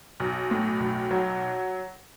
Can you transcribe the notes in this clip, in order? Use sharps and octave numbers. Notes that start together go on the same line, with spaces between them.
B1
A2
B1
F#3